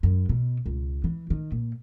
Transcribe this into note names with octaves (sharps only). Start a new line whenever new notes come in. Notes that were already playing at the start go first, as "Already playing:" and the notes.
F#2
B2
C#2
E3
D#3
A#2